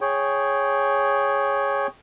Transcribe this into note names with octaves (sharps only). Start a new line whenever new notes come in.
G#4 C#5 G5